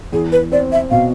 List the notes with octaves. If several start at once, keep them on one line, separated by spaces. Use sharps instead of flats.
E2 G#4
B4
C4 D5
E5
B2 F5